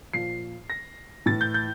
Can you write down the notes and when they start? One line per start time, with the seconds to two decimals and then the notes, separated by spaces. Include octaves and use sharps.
0.13 A#2 F3 C7
0.70 A#6
1.26 A2 E3 A6
1.41 G6
1.54 G6